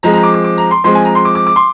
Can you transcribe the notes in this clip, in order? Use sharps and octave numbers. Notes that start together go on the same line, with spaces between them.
F3 G#3 C4 A#5
A#5
D6
D6
D6
A#5
C6
F3 G#3 C4 C6
G#5
A#5
C6
D6
D6
D6
C6